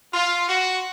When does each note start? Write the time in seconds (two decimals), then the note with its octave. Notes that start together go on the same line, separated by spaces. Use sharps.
0.14 F4
0.49 F#4